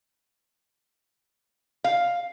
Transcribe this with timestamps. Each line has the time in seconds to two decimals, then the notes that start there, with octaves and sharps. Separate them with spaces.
1.84 F5